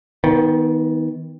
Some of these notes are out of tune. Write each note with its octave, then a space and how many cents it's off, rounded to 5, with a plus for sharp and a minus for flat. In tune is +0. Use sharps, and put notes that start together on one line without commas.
D#3 +30 B3 +0